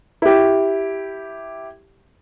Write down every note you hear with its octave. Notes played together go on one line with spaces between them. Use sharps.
E4 G4